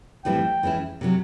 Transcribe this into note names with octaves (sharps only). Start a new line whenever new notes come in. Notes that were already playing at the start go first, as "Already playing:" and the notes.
A2 E3 G3 C4 E4 G5
E3 G#3 C#4 E4
C3 D#3 F#3